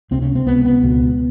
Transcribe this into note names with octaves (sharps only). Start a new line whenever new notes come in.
C#2 C3 C4
C#4
C4
C#2 C3 B3
B3
C#2 B2